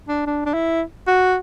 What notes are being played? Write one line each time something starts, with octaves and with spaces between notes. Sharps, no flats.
D4
D4
D4
E4
F#4